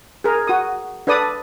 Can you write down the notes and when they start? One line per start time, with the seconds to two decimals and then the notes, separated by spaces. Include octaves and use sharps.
0.24 G#4 A#4
0.47 F#4 D#6
1.07 D4 A4 B4 D5 D#6